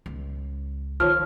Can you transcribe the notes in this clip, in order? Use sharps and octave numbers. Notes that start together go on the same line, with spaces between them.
C#2
D#3 F3 C#5 F6